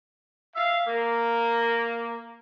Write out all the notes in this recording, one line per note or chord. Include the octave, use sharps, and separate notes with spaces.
E5 F5
A#3